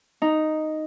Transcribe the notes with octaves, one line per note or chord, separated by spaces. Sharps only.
D#4